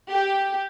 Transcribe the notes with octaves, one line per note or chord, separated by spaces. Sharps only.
G4